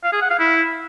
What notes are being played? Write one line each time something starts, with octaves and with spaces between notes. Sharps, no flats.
F5
G#4
F#5
F5
E4